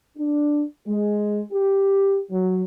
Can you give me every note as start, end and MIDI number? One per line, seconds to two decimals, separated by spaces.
0.17 0.62 62
0.86 1.40 56
1.51 2.19 67
2.30 2.62 54